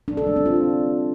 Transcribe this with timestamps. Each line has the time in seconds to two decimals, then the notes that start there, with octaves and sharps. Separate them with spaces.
0.08 D4
0.17 A4
0.27 G3
0.36 C4
0.46 F4